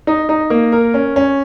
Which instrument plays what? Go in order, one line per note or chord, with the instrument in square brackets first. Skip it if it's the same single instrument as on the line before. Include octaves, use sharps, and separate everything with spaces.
[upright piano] D#4
D#4
A#3
A#4
C#4
C#4